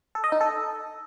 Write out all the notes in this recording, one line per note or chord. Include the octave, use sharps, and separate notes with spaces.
A4
D#5
D#4
A4